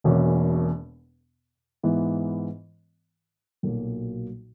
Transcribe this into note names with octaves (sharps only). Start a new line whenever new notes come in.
E1 E2 B2 A#3 C#4
G#2 E3 B3 E4
B1 A#2 F#3 A#3